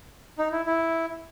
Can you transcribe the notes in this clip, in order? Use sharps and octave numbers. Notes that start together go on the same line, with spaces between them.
D#4
E4
E4